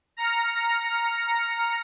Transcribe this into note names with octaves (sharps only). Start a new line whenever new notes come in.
A#5 F6 A#6 C#7